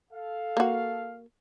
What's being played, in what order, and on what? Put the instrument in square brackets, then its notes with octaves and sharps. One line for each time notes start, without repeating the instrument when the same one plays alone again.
[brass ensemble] A4 F5
[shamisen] A#3 F#4